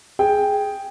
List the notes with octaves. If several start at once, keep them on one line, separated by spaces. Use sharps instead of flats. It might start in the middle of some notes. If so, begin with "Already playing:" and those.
G#4 G5